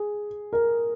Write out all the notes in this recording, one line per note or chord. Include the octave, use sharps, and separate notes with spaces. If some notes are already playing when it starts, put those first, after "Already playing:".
Already playing: G#4
A#4